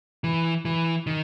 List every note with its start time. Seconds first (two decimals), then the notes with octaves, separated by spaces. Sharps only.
0.24 E3
0.65 E3
1.07 D#3